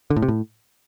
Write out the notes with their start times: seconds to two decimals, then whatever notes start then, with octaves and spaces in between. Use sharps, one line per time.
0.10 D3
0.16 A2
0.22 C3
0.28 A2